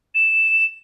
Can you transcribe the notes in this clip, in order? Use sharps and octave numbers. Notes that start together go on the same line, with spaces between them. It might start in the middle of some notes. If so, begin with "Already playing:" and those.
E7